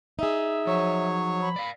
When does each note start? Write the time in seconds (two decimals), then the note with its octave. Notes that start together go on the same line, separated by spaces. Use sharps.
0.19 D#4 G#4 E5
0.67 F3 F#3 C#5
1.42 B5
1.56 D5 F5